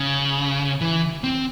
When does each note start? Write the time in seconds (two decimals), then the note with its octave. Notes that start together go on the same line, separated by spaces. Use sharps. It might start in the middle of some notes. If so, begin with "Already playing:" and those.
Already playing: C#3
0.81 E3
1.24 C4